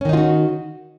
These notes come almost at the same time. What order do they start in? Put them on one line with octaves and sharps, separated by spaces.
C#4 D#3 D#4 F4 F#4